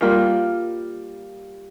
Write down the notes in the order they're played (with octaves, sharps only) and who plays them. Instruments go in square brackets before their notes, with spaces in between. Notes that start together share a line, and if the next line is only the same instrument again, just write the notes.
[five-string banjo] G3 A#3 F4 A#4